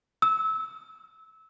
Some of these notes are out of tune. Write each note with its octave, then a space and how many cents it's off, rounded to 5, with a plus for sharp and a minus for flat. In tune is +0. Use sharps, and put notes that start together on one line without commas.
E6 -20